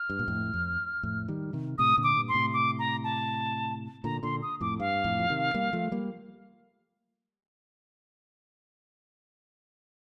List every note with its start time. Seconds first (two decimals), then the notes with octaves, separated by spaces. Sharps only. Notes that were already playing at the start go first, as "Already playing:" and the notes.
Already playing: F6
0.10 G2
0.19 A#2
0.28 F2 A2
0.54 F2
1.03 F2 A2
1.28 D#3 G3
1.53 C3 D#3
1.78 A2 C3 D#6
1.97 A#2 D3
2.04 D6
2.16 G2 A#2
2.29 C6
2.34 A2 C3
2.54 D6
2.79 A#5
3.04 A5
4.04 A#2 D3 A#5
4.23 A#2 D3 C6
4.42 D#6
4.61 F2 A2 D6
4.80 G2 F5
5.04 F2 A2
5.19 F3
5.29 C3 D#3
5.54 G3 A#3
5.73 F3 A3
5.92 G3 A#3